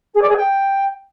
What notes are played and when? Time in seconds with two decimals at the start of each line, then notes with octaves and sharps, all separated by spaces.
0.14 G#4
0.21 D5
0.29 G#4
0.36 G5